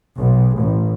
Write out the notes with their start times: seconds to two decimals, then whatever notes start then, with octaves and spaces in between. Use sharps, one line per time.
0.17 B1
0.56 A1